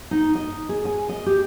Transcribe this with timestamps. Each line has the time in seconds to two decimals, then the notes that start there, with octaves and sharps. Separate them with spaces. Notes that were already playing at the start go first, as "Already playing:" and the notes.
0.11 D#4
0.35 D#5
0.69 G#4
0.85 G#5
1.09 D#5
1.26 G4